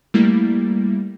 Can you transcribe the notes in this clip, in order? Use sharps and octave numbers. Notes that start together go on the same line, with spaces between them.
G3 A3 A#3 E4